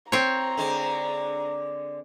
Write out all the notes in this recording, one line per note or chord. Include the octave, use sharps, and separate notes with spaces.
C4 C#5 A#5
D3 G#3